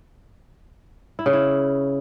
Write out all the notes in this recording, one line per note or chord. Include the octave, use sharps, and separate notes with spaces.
E4
C#3
E4